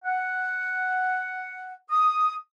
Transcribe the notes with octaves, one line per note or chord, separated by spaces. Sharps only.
F#5
D#6